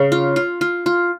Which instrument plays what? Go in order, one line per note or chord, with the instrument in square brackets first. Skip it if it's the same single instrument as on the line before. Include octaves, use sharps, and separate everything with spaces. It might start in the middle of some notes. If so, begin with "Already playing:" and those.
Already playing: [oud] C#3
[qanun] F4
F4
F4
F4